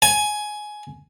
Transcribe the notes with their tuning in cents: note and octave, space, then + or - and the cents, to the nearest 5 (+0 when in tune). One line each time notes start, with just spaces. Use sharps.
G#5 +15